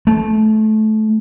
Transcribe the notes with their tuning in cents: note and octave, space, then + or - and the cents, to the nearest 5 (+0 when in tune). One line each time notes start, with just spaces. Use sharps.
A3 -20